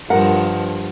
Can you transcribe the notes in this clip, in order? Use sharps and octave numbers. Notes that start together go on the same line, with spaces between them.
G2 F3 A#4 F#5